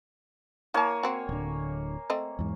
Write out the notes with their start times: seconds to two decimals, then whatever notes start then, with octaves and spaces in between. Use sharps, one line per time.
0.74 A#3 E4 C#5 G#5 A5
1.03 C4 F#4
1.29 D1 D3
2.10 A3 C4 D#5
2.39 E2 G#2